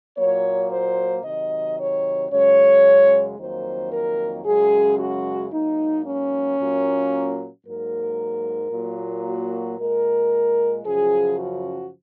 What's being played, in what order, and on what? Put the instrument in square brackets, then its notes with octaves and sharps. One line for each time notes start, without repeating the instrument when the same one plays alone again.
[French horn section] A#2 F#3 A#3 C#5
C5
C3 D#3 F#3 D#5
C#5
F#2 C#3 G#3 C#5
F2 D#3 F#3 A#3 C5
A#4
F#2 C#3 G#3 G#4
F#4
G#2 F#3 A#3 D#4
C#4
A#2 F#3 A#3
G#2 F#3 A#3 A#4
A#2 F#3 A#3
F#4
A#2 G#3 A#4
F#2 C#3 F3 G#4
F#4